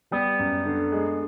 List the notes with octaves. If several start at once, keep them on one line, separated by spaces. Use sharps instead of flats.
G3 B3
F#2
D3
G#3